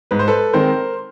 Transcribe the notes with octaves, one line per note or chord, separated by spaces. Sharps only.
G#2 B4
C5
A4 B4
D#3 G#3 C4 A#4 C5